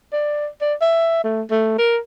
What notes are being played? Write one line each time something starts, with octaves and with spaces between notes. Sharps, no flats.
D5
D5
E5
A3
A3
A#4